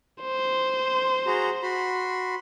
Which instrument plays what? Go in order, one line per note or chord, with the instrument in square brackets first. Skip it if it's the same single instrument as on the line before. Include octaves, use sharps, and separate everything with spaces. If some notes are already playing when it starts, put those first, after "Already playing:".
[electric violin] C5
[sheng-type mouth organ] F#4 G#4 A#5
F#4 B5 C6